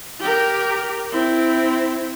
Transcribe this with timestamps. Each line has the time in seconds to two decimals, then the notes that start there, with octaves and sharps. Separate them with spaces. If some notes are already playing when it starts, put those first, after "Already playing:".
0.20 G4 A#4
1.11 C4 E4